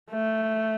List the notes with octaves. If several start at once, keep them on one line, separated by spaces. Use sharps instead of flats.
A3